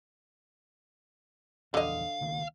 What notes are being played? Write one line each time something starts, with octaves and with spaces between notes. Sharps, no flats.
A#1 E2 D3 D#5 F5
C#2 D#3 A#3